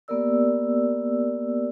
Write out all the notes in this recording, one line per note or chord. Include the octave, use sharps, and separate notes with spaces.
A#3 B3 G4 A#4 D5 E6